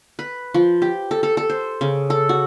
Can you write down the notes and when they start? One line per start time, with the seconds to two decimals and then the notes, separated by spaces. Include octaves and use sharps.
0.19 B4
0.54 F3
0.82 G4
1.11 A4
1.23 A4
1.37 A4
1.50 C5
1.81 C#3
2.10 A4
2.29 F#4